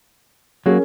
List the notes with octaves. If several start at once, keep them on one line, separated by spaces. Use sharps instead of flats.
F#3 A#3 C#4 F#4 G#4 A#4